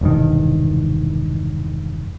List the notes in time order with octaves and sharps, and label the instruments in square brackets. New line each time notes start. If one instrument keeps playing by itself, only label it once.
[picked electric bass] E1 C2 G2 D#3